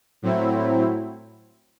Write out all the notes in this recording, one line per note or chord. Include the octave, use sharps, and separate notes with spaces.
A2 F#3 C4 E4